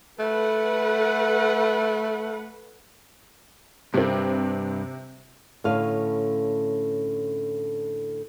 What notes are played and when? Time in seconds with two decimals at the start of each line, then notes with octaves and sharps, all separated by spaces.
0.19 A3 A4 B4 F#5
3.94 G2 C3 C4
5.64 A2 D3 C#4 B4 F5